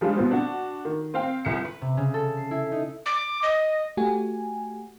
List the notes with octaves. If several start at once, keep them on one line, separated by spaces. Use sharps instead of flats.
F3 G3 G#3 D4 F4
B2 B3 C4
D4 F#4
D#3
C4 F5 G5
G1 C2 C#7
B4
C3
C#3
A4
C7
E4
D#4
D6
D#5
A3 F#4 G4 G#5